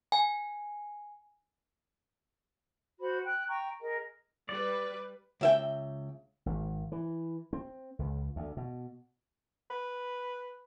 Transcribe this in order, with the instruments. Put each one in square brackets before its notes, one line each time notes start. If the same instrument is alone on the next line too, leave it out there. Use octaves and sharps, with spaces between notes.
[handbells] G#5
[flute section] F#4 C5 B5
G5 F#6
G5 A#5 C#6
G#4 A#4 D#5
[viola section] G3 B4 [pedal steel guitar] D5
[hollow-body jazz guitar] C#2 E5 G5
[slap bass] G#1
E3
C4
C#2
D2
B2
[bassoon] B4